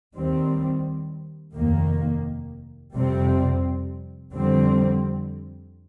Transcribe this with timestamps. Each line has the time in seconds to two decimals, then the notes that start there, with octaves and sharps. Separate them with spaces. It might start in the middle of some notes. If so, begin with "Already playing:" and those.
0.16 D#2 D#3 G3 C4
1.55 F1 D#2 D#3 A#3
2.95 F2 C3 G3 C4
4.35 F2 D3 G3 C4